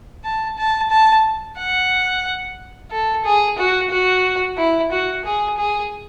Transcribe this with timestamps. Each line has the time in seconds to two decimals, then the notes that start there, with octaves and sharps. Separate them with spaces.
0.24 A5
0.58 A5
0.90 A5
1.58 F#5
2.91 A4
3.25 G#4
3.58 F#4
3.91 F#4
4.57 E4
4.91 F#4
5.25 G#4
5.57 G#4